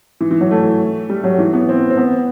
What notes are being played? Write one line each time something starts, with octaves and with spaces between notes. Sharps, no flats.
E3
E3
F#3
A3
G3
F#3
E3
B3
C4
C4
B3